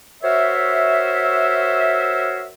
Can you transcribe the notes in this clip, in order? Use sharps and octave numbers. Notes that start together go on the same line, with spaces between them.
F#4 A#4 C5 C#5 E5